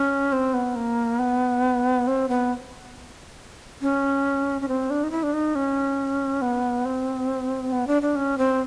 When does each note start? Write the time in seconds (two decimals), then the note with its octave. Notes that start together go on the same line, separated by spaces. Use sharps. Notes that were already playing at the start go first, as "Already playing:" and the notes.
Already playing: C#4
0.32 C4
0.54 B3
0.76 A#3
1.19 B3
2.07 C4
2.29 B3
3.81 C#4
4.61 C#4
4.68 C4
4.90 D4
5.03 D#4
5.11 E4
5.23 D4
5.33 D#4
5.55 C#4
6.42 B3
6.85 C4
7.72 B3
7.87 D4
8.02 D4
8.16 C#4
8.38 C4